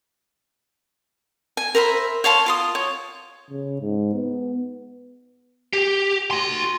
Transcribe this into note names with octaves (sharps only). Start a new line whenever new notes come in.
G#5
A#4 C5 E5 B5
C#5 F5 A5 C6
F4 C6 D#6
C#5
C#3
G#2
B3
G4
F#4 C6